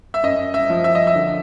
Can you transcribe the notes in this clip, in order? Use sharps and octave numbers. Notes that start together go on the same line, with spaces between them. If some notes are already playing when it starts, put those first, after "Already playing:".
E5
F#2 D#5
E5
F3
E5
D#5
E5
D3